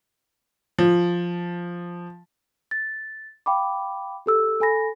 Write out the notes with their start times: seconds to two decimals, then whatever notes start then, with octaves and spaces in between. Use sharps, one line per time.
0.78 F3
2.71 A6
3.46 F5 G5 B5 D6
4.26 G4 A4 E6
4.61 A4 G#5 B5 A#6